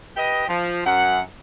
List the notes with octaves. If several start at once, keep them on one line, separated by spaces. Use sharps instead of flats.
G4 B4 D#5
F3
F#2 F#5